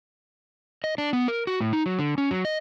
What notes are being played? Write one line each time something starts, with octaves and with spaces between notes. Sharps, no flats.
D#5
D4
B3
A#4
F#4
A2
D#4
F#3
D3
C#4
F#3
D#5